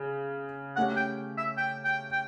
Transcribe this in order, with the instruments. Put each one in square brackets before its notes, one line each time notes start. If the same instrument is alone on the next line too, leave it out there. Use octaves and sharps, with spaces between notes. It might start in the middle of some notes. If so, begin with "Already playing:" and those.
Already playing: [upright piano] C#3
[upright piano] A3 C#4 G4 [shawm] F#5
[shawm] G5
E5
G5
G5
G5